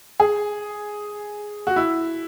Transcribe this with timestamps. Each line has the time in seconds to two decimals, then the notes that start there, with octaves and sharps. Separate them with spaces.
0.20 G#4
1.67 F#4
1.76 E4